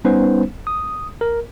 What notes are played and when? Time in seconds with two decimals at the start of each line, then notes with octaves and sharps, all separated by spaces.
0.05 G3 B3 C#4 D#4 B4 C5
0.67 D#6
1.21 A#4